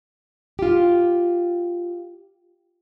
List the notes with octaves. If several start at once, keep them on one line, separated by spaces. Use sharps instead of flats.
F4 G4